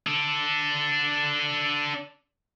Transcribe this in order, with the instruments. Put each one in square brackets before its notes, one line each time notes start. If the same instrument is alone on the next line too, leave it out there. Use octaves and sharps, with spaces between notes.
[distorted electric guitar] D4 A4